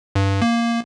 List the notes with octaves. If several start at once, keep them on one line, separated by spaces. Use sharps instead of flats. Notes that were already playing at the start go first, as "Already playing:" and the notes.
G2
A#3